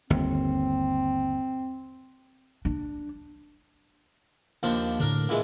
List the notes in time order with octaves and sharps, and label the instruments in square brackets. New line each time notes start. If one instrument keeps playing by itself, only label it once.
[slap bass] G1 D#2 [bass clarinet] C4
[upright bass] D4
[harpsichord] D#2 F3 D4
[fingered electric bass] A2 D3 [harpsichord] D4 A#4
[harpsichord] A#2 E3 G#3